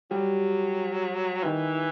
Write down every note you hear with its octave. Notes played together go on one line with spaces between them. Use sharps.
F#3 G3
D#3 E3